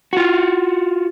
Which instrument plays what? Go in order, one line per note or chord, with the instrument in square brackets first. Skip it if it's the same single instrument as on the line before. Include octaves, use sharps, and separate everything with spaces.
[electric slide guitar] F4 F#4